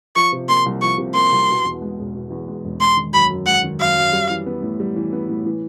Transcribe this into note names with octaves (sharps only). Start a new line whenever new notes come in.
F3 C#6
C3
A#3 C6
C2
F3 C#6
C3
A#3 C6
C2
B2
E2
G#3
E1
B2
E2
G#3
E1
G#3 C6
D#3
F#2 B5
F#2
G#3 F#5
D#3
F#2 F5
F#2
G3
E3
B3
A2
G3
E3
B3
A2
E3